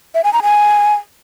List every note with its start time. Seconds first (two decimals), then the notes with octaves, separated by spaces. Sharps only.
0.15 E5
0.24 G#5
0.33 A#5
0.43 G#5